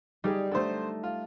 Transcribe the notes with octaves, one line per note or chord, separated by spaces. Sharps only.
G3 D#4 G4 G#4
D3 A3 D#4 A4 C5
F4